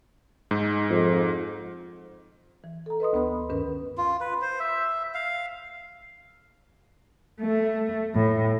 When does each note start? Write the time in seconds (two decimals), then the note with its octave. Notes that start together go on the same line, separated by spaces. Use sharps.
0.51 G#2
0.90 F2
2.64 E3
2.86 A4 A#5
3.00 B4 D#5 C6 D#6
3.13 D2 B3 B4 B5 C6
3.49 G2 D#3 C#4 A#4 B4
3.98 F4
4.21 B4
4.42 C5
4.60 E5
5.14 F5
7.40 A3
8.15 A2